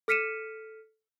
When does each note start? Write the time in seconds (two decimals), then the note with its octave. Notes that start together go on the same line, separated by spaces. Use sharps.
0.08 A4 F6 B6 C#7 D#7 E7